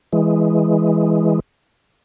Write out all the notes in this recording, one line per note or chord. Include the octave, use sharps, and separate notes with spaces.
E3 G#3